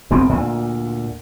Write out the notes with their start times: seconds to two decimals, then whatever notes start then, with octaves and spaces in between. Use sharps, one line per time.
0.10 F#1 F#2 B3 C4
0.29 D2 A#2